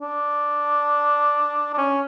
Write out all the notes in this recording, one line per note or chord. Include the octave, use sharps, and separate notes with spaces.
D4
D4
C#4